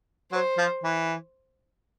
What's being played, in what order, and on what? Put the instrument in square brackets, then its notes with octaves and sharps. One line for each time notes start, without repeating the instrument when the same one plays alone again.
[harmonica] F#3 [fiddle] C5
[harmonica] F3
E3